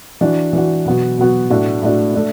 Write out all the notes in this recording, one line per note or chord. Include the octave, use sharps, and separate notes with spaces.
E3 D4 F#4
E3 D4 F#4
B2 F#3 B3 F#4
B2 F#3 B3 F#4
A2 A3 D4 F#4
A2 A3 D4 F#4
A3 D4